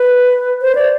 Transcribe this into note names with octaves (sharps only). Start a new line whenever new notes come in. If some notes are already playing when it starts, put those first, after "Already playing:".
Already playing: B4
C5
D5